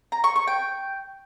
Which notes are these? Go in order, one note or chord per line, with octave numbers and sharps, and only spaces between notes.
A#5
C#6
C#6
G5